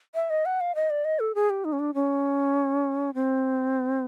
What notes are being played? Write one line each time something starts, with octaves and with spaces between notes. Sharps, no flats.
E5
D#5
F#5
F5
D#5
D5
D#5
A4
G#4
G4
D#4
C#4
D4
C#4
C4